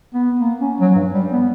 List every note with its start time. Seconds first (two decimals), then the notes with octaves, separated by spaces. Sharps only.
0.14 B3
0.40 A#3
0.60 C#4
0.80 F#3
0.95 G2
1.13 G3
1.32 B3